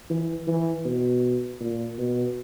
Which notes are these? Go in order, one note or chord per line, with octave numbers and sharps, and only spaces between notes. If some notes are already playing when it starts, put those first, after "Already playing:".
E3
E3
B2
A#2
B2